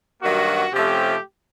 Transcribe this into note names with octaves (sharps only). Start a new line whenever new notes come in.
G2 D#3 F#3 A#3 F#4
C3 F3 A3 C#4 G4